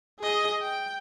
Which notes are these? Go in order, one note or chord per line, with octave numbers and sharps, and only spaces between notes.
G#4 D#5
G5